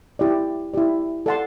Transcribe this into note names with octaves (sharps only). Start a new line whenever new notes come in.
E4 G4 D5
E4 G4 D5
A4 D5 F#5 A5 C6